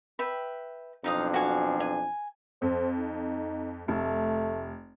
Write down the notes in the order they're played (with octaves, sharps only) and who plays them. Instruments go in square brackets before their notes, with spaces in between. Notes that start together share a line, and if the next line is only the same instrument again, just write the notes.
[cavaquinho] B4 E5 G5
[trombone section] B1 F2 D4 [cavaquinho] D#4 F5 D#6
[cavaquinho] F#4 F5 G#5
G#5
[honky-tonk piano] F2 [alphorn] C5
[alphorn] D#4
[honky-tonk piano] F1 [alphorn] A3